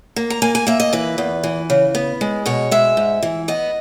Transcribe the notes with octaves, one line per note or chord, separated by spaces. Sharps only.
A#3
A#5
A#3 G#5
G#5
A#3 E5
D#5
E3 B4
E2
E3
C#3
B3
G#3
B2 C#5
G#3 E5
G#2
E3
B3 D#5